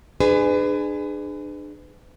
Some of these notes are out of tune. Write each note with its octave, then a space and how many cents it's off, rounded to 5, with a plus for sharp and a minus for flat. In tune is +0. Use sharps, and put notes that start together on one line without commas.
D4 +35 G#4 +0 B4 +35